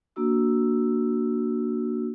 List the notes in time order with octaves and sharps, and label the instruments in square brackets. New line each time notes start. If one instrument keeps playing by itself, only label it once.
[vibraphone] A#3 D4 F#4 E6